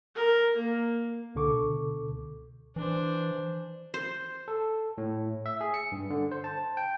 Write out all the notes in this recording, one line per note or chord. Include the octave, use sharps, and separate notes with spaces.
A#4
A#3
C#2 B2 D3 A4 C#6 D6
E3 D4 C5
C5
A4
A2
E5
G#4
C#7
G2
D3
C5
A5
G5